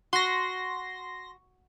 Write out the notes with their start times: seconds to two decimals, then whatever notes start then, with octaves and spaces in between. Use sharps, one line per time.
0.13 F#4 C6 A#6